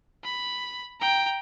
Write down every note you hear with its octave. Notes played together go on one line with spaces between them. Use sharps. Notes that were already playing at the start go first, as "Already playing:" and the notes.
B5
G5 A#5